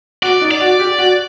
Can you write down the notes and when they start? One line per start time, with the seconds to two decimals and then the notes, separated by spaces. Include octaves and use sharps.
0.22 F#4 D5
0.41 D#4
0.51 D5
0.60 F#4
0.79 G4
0.98 F#4